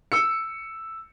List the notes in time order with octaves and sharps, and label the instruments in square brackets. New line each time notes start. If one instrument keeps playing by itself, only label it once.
[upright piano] E6 C#7